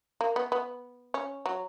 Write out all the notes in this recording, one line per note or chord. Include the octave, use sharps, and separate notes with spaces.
A#3
B3
B3
C#4
F#3